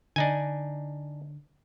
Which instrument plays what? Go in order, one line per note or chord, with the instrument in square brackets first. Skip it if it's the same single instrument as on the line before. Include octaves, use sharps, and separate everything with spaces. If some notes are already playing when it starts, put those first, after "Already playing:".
[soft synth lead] D3 [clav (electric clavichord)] D4 D#4 G#5